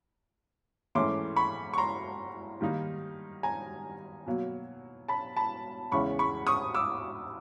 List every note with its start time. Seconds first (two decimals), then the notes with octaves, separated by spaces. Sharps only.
0.95 G#2 E3 A3 C#4 C6 D6
1.36 B5 C#6
1.74 C#6
1.78 A#5 C6
2.61 D#3 G3 A#3 D#4
3.43 G#5 A#5
4.26 B2 F#3 A#3
5.08 A5 B5
5.36 A5 B5
5.92 E2 C#3 E3 G#3 C#4 B5 C#6
6.19 B5 C#6
6.47 C#6 D#6
6.75 D6 E6